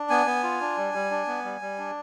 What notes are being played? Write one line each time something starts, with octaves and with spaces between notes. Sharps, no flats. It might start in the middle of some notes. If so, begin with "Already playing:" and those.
Already playing: D4
B3 G#5
B3
F4
D4
G3
G3
D4
B3
G3
G3
D4